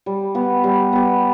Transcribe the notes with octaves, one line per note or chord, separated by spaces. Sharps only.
G3
B3 G4
G3
B3 G4